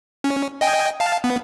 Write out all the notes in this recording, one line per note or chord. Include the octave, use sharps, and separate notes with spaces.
C#4
D#5 G5 G#5
F5 A5
B3